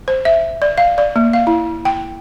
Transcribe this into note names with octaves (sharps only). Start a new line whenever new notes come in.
C5
E5
D5
F5
D5
A#3
F5
E4
G5